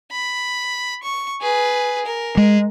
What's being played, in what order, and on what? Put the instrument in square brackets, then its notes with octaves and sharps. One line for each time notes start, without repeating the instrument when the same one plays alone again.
[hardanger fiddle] B5
C#6
G#4 B4
A#4
[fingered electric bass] G#3